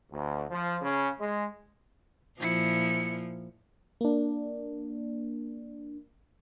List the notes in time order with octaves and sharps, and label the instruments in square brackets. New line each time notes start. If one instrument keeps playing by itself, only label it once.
[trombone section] D2
F3
C#3
G#3
[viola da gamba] A#2 F3 [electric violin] E4 C#7
[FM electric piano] A#3 D4